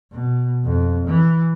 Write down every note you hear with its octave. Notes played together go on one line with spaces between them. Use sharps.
B2
F2
E3